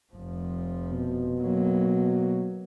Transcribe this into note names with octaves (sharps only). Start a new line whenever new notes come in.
F1 F3
B2
F#3 A#3